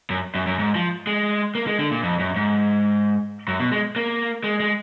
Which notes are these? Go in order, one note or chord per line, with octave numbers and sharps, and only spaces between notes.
F#2
F#2
F#2
G#2
F3
G#3
A#3
G#3
D3
A#2
F2
F#2
G#2
F#2
B2
G#3
A#3
G#3
G#3